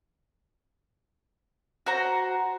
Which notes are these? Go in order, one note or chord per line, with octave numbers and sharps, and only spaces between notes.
F#4 C5 A#5